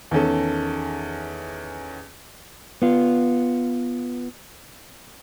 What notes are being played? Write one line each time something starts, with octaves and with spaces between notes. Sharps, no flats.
E2 D#3 C#4 A4
B3 F4